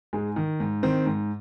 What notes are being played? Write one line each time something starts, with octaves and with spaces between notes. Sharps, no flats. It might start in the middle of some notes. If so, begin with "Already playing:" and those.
G#2 G#3
D#3
G#2
D#3 C4
G#2